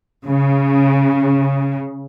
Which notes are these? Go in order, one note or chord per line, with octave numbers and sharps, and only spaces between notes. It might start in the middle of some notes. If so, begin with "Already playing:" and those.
C#3